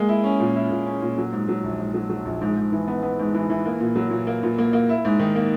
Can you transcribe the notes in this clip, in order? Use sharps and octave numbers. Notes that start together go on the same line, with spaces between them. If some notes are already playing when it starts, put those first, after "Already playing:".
Already playing: G#3 A#3
E4
C#4
A#2
E4
A#2
C#4
A#2
F#3
G#2
F#3
A#1
G#2
F#3
F#3
A#1
G#2
G#2
E3
B3
B3
G#2
E3
E3
A#3
A#2
F#3
A#2
A#3
A#2
A#3
A#3
E4
G#2
D#3
A#3